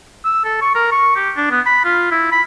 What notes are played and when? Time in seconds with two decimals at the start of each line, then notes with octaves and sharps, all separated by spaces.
0.25 E6
0.45 A4
0.61 C#6
0.75 A#4
0.92 C#6
1.16 G4
1.37 D4
1.51 B3
1.66 B5
1.85 F4
2.11 E4
2.32 B5